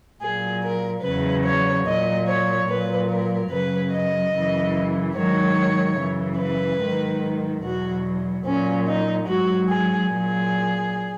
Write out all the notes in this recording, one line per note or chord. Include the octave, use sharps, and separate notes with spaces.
A#2 F#3 G#4
A#4
E2 C#3 F#3 B4
C#5
A#2 F#3 D#5
C#5
A#2 F#3 B4
A#4
F#2 C#3 F#3 B4
D#5
F#2 C#3 E3
G#2 D#3 F#3 C#5
F#2 C#3 E3
B4
G#2 D#3 F#3
E2 B2 F#3 F#4
A#2 F#3 C#4
D#4
G#2 F#3 F#4
G#4
A#2 F#3 G#4